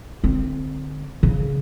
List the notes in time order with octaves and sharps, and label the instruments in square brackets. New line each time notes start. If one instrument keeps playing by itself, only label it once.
[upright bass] D3 C4
C#3